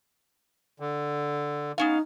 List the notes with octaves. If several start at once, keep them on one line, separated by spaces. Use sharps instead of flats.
D3
B3 C#4 D#4 F5